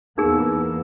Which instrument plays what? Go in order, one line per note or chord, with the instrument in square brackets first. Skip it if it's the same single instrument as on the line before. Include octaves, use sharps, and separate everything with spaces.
[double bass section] E2 A#3 B3 [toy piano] D#4 G#4 [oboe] E6